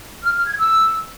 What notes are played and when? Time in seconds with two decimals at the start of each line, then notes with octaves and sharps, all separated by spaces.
0.24 F6
0.35 F6
0.46 G#6
0.58 E6